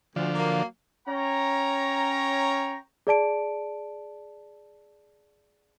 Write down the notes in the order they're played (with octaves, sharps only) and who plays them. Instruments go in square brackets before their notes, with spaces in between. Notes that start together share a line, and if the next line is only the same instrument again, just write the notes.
[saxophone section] D2 [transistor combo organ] D3 F3
[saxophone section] F#3 A#3
[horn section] C#4 C#5 G5 A#5
[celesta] G#4 D5 A5 D7